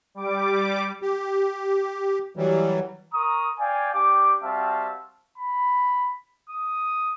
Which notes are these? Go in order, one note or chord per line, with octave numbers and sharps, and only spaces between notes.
G3 D6
G4
E3 F#3 G3
A#4 A#5 C#6 D#6
D5 F5 G5 G#5
D4 G4 G5 D6
G3 C4 F#4 E5 F5 A5
B5
D#6